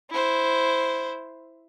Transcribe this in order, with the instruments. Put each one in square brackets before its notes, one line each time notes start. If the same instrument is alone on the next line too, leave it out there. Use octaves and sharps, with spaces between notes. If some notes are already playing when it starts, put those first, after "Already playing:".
[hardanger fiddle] E4 C5